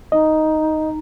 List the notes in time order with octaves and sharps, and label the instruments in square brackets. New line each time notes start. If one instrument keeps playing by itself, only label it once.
[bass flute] D#4 [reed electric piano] D#5